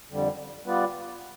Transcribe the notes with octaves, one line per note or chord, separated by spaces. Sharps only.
F2 D3 G3
G3 B3 F4 B4 D5